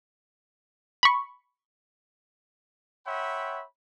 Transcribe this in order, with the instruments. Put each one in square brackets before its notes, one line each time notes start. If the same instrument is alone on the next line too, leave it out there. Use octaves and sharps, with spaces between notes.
[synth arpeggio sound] B5 C#6
[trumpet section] C#5 E5 F#5 G5 B5 C6